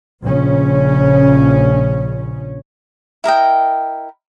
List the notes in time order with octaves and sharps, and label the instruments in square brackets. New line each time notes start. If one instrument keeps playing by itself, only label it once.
[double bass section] A#1 C#3 C#4
[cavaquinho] E4 A#4 D#5 G5